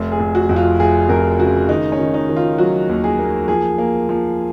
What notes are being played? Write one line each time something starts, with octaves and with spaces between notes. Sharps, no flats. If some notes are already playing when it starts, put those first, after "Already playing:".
Already playing: F1
G#4
F1
F#4
F2
F4
F1 G#4
F2 A#4
C#3 F#4
D#3 D#4
C#4
D#3
D#4
D#3
F4
F#3 F#4
D#2
G#4
A#3
F3 G#4
A#3
F3